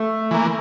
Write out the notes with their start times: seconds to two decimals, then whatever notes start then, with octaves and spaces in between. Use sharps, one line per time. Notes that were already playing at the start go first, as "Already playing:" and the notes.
Already playing: A3
0.31 E3 A#3